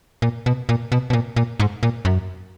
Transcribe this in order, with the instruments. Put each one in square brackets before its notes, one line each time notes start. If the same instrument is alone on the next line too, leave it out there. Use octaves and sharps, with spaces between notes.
[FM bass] A#2
B2
A#2
B2
B2
A#2
A#2
G#2
A#2
F#2